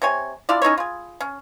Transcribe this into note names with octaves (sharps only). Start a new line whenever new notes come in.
C3 C#5 G#5
D4 E4 F4 D5
C#4 D#4 E4 C#5
F4 G#4
C#4